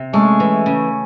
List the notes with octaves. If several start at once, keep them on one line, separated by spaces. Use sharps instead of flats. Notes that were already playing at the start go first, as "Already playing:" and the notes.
Already playing: C3
G#3 A3 C#4
E3
C#3